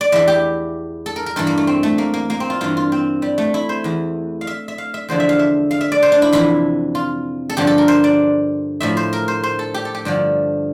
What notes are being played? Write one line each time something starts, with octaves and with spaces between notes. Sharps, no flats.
D5
E2 E3 E5
G4
A4
A#4
A#4
G2 E3 A4
A#3
A3
C4
A3
A#3
A#3
A#3
C4
F4
G2 E3 F4
F4
C4
G3
A3
E4
C5
E2 E3
F5
E5
E5
F5
E5
E2 D3 F3 C5
E5
F5
E5
F5
E5
D5
C5
D4
E4
F2 C3 E3 E4
F4
A4
G2 D3 F3 G4
A4
A#4
C5
D5
A2 F3 E5
C5
A#4
C5
C5
A4
G4
A4
G4
G2 D3 F3